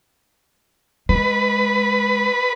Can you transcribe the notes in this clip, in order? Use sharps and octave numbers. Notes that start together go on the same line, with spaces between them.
G#3 B4